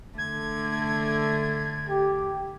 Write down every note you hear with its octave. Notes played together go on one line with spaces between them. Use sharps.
D3 A3 G#6
G4